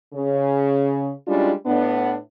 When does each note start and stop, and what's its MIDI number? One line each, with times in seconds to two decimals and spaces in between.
0.13 1.11 49
1.27 1.51 55
1.27 1.51 56
1.27 1.51 61
1.27 1.51 62
1.27 1.51 64
1.27 1.51 65
1.65 2.15 45
1.65 2.15 59
1.65 2.15 62